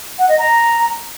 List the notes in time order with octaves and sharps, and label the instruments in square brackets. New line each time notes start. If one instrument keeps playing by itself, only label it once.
[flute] F#5
D#5
A#5